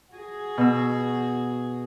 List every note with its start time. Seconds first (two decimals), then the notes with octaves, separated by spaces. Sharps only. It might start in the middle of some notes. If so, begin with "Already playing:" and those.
0.13 F#4 G#4
0.58 B2 E6